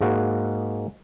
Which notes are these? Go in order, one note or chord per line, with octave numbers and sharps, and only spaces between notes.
G#2 G#3 A#3 F#4